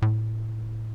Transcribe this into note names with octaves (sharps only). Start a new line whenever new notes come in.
A2